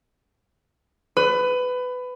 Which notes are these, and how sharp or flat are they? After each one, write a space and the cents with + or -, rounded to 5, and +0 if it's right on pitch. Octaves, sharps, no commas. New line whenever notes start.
B4 +20